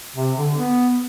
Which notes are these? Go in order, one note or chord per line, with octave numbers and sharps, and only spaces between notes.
C3
D3
B3